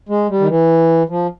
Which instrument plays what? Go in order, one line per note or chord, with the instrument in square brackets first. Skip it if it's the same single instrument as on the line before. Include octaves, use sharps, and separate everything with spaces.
[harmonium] G#3
G3
D#3
E3
F3